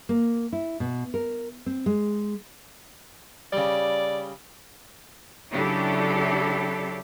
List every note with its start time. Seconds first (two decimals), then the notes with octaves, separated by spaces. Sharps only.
0.09 A#3
0.53 E4
0.80 B2
1.14 A#4
1.66 C4
1.86 G#3
3.53 C#3 G3 D5
5.51 C#3 F#3 D4 E4 G4 A4